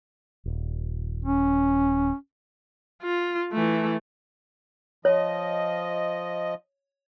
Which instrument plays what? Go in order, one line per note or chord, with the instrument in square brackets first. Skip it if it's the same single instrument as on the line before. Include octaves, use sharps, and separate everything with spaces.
[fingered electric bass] D#1
[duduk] C#4
[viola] F4
E3 A3
[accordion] F3 D#5 [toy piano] C#5